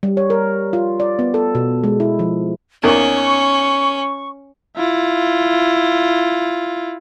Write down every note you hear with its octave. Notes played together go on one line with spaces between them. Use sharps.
G3
C#5
A#4
F4
D5
B3
A4
B2
G#3
E4
F3
E2 D#3 A#3 C#4 C#6
E4 F4